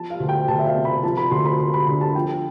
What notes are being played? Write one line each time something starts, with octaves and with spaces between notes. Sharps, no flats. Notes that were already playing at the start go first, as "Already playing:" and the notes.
Already playing: F3 A5
F5
D2
G5
D2 A5
E5
F5
C3
B5
F3 A5
B5
D2 C6
B5
D2 C6
B5
D3 B5
A5
F3 G5